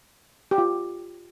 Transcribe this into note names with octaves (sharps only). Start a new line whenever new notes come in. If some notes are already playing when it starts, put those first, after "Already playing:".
G4
F4